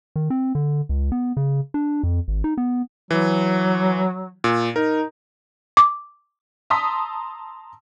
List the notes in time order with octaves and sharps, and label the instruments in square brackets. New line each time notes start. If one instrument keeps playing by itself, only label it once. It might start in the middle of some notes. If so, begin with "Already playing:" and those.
[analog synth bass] D#3
C4
D3
C#2
B3
C#3
D4
F2
G#1
D#4
B3
[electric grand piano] E3 [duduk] F#3
[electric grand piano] A#2
[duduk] D#4 [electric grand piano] A#4
[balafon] D6
[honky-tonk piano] A5 A#5 C6 D#6 E6 B6